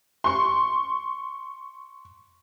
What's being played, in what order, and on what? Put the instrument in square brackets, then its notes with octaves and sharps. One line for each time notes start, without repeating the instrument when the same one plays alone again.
[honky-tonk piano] C6 C#6